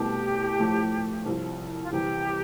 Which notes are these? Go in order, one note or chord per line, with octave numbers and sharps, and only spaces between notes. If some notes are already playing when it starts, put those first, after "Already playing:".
Already playing: C2 B2 A3 G4
A2 F3 A3
C2 C3 F3
F4
C2 C3 E3 G3 G4